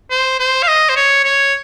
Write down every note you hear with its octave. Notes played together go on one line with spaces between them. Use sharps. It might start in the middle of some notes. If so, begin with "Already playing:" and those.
C5
C5
F5
D#5
C5
C#5
C#5